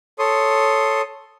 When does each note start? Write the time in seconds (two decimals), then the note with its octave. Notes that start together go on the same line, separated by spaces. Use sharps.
0.19 A4 C#5 C6 D#6